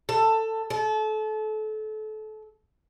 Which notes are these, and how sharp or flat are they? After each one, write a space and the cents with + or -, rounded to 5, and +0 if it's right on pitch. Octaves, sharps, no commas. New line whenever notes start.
A4 +15
A4 -30